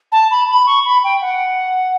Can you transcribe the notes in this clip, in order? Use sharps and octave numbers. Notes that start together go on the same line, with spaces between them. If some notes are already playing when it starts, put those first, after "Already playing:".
A5
B5
B5
C#6
B5
G5
F#5